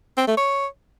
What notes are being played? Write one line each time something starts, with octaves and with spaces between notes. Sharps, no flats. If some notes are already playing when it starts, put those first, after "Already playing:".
C4
A3
C#5